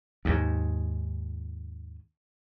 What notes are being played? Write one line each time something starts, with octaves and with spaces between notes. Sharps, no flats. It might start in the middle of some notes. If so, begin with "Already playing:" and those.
D#2 G#2